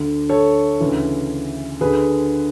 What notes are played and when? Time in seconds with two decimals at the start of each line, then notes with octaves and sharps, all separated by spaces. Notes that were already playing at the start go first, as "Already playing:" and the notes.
Already playing: D2 D3
0.29 A4 C#5
0.80 D2 C#3 E3
1.81 D2 D3 G#4 B4